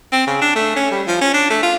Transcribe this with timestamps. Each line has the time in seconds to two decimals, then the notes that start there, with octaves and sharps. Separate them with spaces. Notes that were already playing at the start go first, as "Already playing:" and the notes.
0.12 C4
0.27 C#3
0.41 D4
0.55 A3
0.77 C#4
0.91 G3
1.07 F3
1.21 C#4
1.34 D4
1.50 A3
1.63 F4